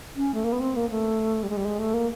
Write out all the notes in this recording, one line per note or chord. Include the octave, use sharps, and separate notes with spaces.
C#4
A3
A#3
B3
C4
A#3
A3
G3
G#3
G3
G#3
A3
A#3